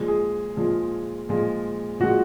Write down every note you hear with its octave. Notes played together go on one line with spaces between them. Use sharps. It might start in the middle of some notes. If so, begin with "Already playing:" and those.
Already playing: A#2 F3 G#3
G#4
A#2 F3 G#3
A#2 F3 G#3
A#2 F3 G#3 F#4